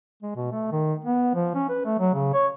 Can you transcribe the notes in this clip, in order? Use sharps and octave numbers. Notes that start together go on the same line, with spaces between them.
G#3
B2
A3
D#3
B3
F3
C#4
B4
A3
F#3
C#3
C#5